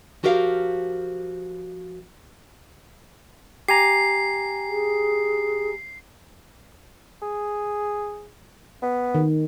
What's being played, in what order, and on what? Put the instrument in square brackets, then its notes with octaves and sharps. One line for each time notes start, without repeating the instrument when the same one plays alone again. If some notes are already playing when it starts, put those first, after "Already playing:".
[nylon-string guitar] F3 F#4 G4 A#4 D#5 F5
[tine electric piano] G4 G#5 A#5 [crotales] C7
[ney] G#4
[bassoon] G#4
B3
[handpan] D#3